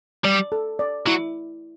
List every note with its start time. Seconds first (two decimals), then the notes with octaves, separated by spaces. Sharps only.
0.24 G3 D5
0.52 A4
0.79 D5
1.06 F#3 E4